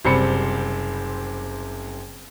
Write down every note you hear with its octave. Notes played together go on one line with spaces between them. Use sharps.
F#1 C3 G3 C5 B5 C#7